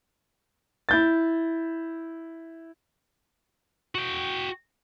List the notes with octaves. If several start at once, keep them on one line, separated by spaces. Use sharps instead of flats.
E4 G6 A6
F#4 G5